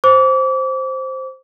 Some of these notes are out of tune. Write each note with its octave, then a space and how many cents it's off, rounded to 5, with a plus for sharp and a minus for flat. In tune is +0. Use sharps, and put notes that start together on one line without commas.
C5 +0 D6 -35